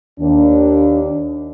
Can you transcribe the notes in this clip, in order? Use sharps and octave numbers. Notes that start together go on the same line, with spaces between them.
D#2 D4